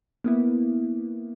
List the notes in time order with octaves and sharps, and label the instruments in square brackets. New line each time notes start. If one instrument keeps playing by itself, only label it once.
[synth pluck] A#3 B3 E4